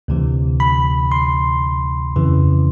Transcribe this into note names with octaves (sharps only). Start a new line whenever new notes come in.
D2 C3 E3
B5
C6
F2 C#3 E3